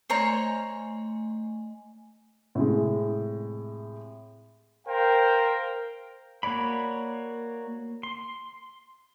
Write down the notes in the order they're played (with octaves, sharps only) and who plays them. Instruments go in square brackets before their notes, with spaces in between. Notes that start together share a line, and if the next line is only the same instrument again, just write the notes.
[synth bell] A3 D#5 G#5 [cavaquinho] C5 C#5 A#5
[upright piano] A2 C3 G#3
[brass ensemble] A#4 C5 F5 G5
[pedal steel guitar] A#3 F#4 C#5 D5 B5
C6